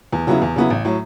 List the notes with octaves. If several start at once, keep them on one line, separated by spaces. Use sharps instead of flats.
E2
C#3 F#3 B3 E4
E2
C#3 F#3 B3 E4
A1
A2 F#3